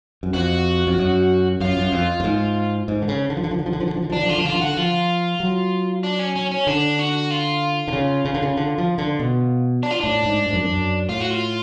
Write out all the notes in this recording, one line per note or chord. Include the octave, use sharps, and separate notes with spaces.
F#2
F2 F#4
F2
F#2
F#2 F4
F#2
F2
F#2
G#2
G#2
D3
C#3
D3
F3
D3
F3
D3
F3
D3
F3
D3
F3
D3
F3
D3 D4
F3
D3 F4
F3 D4
D3 F4
F3
D3 F#4
F3 F4
F#3
D4
C#4
C#4
C#4
D3 D4
F#4
F4
D3
C#3
C#3
D3
C#3
D3
F3
D3
B2
D4
F4
A2 D4
G#2
G#2
F#2
F2
F#2
A2 F4
F#4
F4